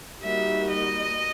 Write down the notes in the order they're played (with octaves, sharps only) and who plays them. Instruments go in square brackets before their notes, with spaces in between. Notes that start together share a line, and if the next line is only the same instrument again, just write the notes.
[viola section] G3 A#3 D#4 F#4 [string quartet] E5
[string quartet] D#5